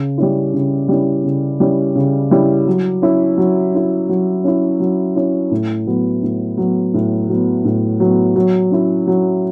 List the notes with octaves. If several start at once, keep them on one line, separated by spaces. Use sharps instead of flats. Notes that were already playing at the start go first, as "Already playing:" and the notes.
Already playing: C#3
G3 C#4 E4
C#3
G3 C#4 E4
C#3
G3 C#4 E4
C#3
G3 C#4 E4
F#3
C#4 E4
F#3
C#4 E4
F#3
C#4 E4
F#3
C#4 E4
A2
F#3 B3
A2
F#3 B3
A2
F#3 B3
A2
F#3 B3
F#3
C#4 E4
F#3